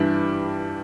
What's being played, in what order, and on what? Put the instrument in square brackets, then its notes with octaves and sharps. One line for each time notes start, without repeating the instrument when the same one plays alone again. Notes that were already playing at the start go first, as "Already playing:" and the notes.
Already playing: [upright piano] G2 E3 G3 D4